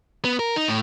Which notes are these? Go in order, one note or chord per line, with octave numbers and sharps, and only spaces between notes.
B3
A#4
D#4
A2